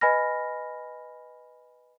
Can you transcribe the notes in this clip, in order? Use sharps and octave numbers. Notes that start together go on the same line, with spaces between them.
B4 D#5 G#5 B5 F6 A#6